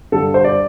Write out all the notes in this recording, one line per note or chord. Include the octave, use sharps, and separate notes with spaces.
G2 D3 G3 A4
C5
D5